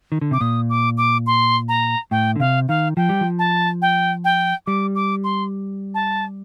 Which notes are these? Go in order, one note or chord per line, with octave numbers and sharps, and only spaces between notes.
D#3
D3
C3 D6
A#2 D#6
D6
D6
C6
A#5
A2 G5
D3
C3 F5
D#3 F5
F3 G5
G3
F3
A5
G5
G5
G3 D6
D6
C6
A5